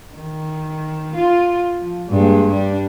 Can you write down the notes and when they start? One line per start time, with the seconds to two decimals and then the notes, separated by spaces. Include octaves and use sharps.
0.16 D#3
1.15 F4
1.79 F3
2.08 G2 G#3 A#3
2.52 G3 D4